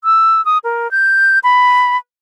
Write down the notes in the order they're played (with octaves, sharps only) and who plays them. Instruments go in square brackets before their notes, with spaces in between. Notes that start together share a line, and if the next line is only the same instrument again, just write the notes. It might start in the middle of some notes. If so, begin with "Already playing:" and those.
[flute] E6
D#6
A#4
G6
B5